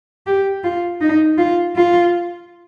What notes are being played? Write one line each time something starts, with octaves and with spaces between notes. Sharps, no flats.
G4
F4
D#4
F4
F4